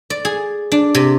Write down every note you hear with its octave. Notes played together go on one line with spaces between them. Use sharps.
D5
G#4
D4
C3